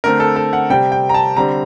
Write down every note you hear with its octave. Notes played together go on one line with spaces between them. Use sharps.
D3 A3 C4 A#4
A4
A4
F#5
C3 G3 C4 G5
G5
A#5
A5
D3 G3 C4 A#5